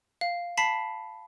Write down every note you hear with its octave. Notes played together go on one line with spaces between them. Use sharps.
F5
A5 B5 B6 C7